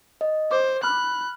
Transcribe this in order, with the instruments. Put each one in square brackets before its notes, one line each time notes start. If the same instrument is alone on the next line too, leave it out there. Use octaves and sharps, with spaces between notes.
[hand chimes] D#5
[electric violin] C5 [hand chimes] D6
[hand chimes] B5 F6 [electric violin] F#6